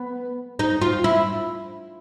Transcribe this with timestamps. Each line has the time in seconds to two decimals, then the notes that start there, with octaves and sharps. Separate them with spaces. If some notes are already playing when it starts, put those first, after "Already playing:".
Already playing: B3
0.59 D#4
0.82 F4
1.04 E4